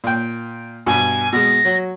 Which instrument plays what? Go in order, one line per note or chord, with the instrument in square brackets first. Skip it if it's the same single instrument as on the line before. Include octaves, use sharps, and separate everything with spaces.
[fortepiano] A#2 G5
[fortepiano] G2 B2 [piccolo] G#5
[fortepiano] B2 G#3 [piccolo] A#6
[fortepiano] F#3